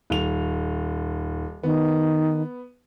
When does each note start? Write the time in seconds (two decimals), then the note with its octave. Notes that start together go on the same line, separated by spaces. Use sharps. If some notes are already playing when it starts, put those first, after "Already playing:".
0.10 D#1 F7
1.63 D#3 B3